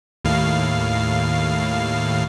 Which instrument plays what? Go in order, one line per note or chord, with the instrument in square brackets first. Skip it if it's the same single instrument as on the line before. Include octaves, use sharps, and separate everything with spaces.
[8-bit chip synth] D#2 A2 F5